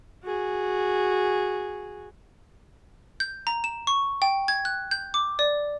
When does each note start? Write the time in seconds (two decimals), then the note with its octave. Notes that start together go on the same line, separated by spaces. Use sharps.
0.24 F#4 G#4
3.20 G6
3.47 A#5
3.64 E7
3.87 C#6
4.22 G5
4.48 G#6
4.65 F#6
4.91 G6
5.14 D6
5.39 D5